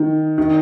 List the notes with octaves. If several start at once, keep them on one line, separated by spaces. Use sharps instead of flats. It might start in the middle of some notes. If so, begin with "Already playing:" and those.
Already playing: D#3
D#3